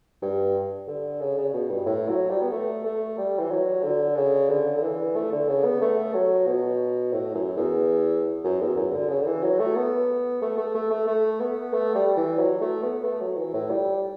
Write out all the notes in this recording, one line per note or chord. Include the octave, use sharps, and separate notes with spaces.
G2
D3
C#3
C#3
B2
G2
A2
F#3
G3
B3
A3
A3
G3
E3
F#3
D3
C#3
D3
D3
E3
A3
D3
C#3
B3
A3
F#3
B2
A2
F#2
E2
F#2
E2
F#2
D3
C#3
D3
E3
F#3
A3
B3
A3
A3
A3
A3
A3
B3
A3
G3
E3
F#3
A3
B3
A3
F#3
E3
A2
G3